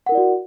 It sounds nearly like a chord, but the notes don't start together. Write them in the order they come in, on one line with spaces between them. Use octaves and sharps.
F#5 A#4 E4 D5 F#4